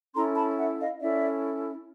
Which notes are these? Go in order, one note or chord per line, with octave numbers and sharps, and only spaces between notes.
C#4 E4 A4 A#5 C6
A5 B5
E5 F#5
D#5 F5
C#4 E4 A4 D5 E5